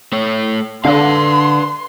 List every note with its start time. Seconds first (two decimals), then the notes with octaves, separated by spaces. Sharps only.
0.13 A3 C#5
0.85 D3 C#4 D4 B4 F5 C6